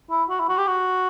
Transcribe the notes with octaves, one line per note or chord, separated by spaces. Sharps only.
E4
F#4
E4
F#4
G4
F#4